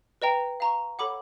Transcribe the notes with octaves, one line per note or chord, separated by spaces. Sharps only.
B4 D#5 G5 A#5
F5 A#5 C#6
A4 C#5 F#5 B5 D6